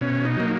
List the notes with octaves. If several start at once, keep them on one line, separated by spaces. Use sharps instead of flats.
B2 C#4
D#4
F#3 A#3